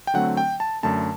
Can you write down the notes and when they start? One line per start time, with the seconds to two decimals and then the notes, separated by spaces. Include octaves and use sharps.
0.07 G5
0.14 D3 F#3 A3 C4 F#5
0.37 G5
0.60 A5
0.83 F#2 D3 A3 D4 A5